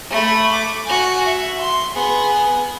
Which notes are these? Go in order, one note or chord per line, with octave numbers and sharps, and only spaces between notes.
A3 B5
D6
F#4 G#5
E5
C6
B3 G#4